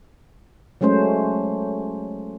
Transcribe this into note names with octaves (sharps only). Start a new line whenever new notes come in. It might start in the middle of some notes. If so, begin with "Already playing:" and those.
F#3 G#3 A3 C#4 C5